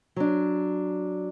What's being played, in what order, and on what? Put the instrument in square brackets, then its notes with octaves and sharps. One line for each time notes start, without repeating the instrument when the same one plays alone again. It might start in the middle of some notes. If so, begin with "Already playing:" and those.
[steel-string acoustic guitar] F#3 D4